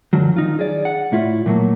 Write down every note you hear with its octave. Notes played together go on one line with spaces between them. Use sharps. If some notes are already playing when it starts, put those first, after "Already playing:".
F#2 D3 F3 F#3
D#3 D#4 F4
G#4 D5
F#5
A2 E4 F4
A#2 F#3 A3 A#3